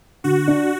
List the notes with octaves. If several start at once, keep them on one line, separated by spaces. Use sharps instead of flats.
D3 F#4
D4